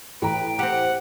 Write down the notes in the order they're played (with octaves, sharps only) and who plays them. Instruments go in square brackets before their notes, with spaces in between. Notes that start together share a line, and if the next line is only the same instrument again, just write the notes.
[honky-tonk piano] A2 E3 A#5 [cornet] B4 [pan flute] G5
[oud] C4 G4 [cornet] F#5